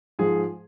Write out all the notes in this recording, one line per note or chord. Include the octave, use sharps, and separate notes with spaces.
G#2 F3 G#4